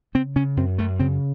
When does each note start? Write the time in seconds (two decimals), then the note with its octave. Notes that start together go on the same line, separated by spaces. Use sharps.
0.15 C#3 C4
0.36 C#3 C#4
0.57 F#2 C4
0.78 F#2 A3
1.00 C#3 C4